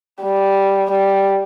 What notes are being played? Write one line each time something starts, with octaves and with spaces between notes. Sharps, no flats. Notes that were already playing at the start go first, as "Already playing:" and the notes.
G3
G3